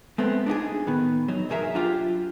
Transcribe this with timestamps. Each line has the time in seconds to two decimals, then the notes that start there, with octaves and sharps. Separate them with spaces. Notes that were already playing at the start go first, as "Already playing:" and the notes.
0.18 G#3 A3 B3 C4
0.46 D4 D#4 F#4 G#4
0.87 A2 D#3 B3
1.28 F#3 D#4
1.49 B1 G2 F#3 G#4 A#4 E5
1.74 F#3 D4 F4 G4